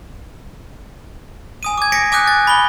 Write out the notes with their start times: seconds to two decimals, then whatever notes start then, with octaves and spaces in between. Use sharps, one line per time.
1.63 G#5 D#6 D#7
1.78 D6 G#6
1.92 A#6 B6 C#7 D7
2.12 G#5 D6 D#6 F#6 G6
2.27 A6
2.47 B5 G7